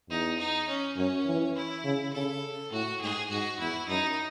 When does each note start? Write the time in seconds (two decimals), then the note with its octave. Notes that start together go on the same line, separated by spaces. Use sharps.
0.09 E2 D#4
0.39 D#4
0.67 C#4
0.96 F#2 C#4
1.26 E3
1.56 E4
1.84 C#3
2.13 C#3 A4
2.72 A2 F#4
3.01 G#2 G#4
3.29 G#2 F#4
3.59 E2 E4
3.88 F#2 D#4